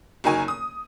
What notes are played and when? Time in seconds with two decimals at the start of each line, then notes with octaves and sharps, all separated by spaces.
0.24 F#1 F#3 D#4 A#4 G#5 C#6
0.48 D#6